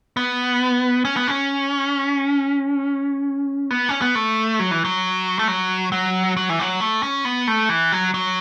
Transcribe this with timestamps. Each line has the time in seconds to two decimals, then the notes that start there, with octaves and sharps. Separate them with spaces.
0.17 B3
1.05 C#4
1.17 B3
1.28 C#4
3.70 B3
3.89 C#4
4.02 B3
4.15 A3
4.60 F#3
4.71 E3
4.85 F#3
5.39 A3
5.48 F#3
5.92 F#3
6.37 F#3
6.49 E3
6.59 F#3
6.80 A3
7.03 C#4
7.25 B3
7.48 A3
7.69 E3
7.92 F#3
8.14 F#3